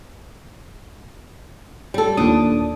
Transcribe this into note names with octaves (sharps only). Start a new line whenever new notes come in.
G3 A4
D#2 A#2 D4 D#6